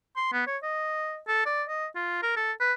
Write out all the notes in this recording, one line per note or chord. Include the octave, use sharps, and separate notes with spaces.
C6
B3
C#5
D#5
A4
D5
D#5
F4
A#4
A4
B4